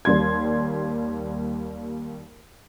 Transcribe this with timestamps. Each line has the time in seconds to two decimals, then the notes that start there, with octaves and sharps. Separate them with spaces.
0.05 D#2 G3 C6 G#6